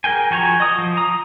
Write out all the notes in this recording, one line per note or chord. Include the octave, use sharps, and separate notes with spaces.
G#4 A#4 G5 G#5
F3 F#4 G#5 A#5 C#6
D#5 D#6
F3
A#5 D#6